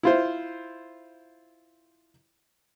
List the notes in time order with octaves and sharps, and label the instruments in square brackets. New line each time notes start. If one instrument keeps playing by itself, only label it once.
[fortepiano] E4 F4 C5